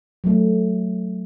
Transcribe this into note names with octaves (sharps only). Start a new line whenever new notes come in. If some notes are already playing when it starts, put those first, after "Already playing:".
F#3 A3